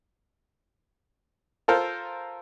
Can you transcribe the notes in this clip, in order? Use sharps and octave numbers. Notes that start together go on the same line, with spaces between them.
F4 A4 A#4 C5